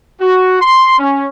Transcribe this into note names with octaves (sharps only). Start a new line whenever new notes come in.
F#4
C6
C#4